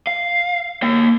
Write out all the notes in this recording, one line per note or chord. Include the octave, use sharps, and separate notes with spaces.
F5
A#3 G5